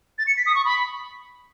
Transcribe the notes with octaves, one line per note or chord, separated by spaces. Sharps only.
A6
C#7
B6
D#6
C#6
B5